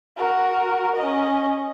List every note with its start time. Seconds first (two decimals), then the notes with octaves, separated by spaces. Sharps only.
0.17 F#4 A#4
0.96 C#4 D#5